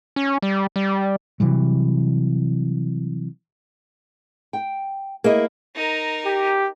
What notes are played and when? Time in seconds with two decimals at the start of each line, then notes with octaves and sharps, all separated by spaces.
0.16 C#4
0.42 G3
0.76 G3
1.40 C3 E3 F#3 G3
4.53 G5
5.24 A#3 E4 G#4 D#5
5.75 D#4 A#4
6.25 G4